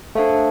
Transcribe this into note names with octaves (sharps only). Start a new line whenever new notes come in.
A3 D4 A4 C5 F5 A5